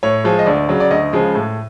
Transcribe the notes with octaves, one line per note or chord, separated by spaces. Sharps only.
A2 C#5
F3 G#3
D#5
D2 D5
C#3 F#3
D5
D2 D#5
C#3 F3 G#3
A2